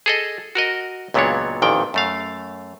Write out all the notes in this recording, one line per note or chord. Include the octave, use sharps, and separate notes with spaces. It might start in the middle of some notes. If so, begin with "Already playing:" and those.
G#4 A4 D#5
F#4 A#4 D#5
C#2 A#2 F#3 B3 D4 C#5
A1 F2 A#2 D#3 G5
F#2 A3 F5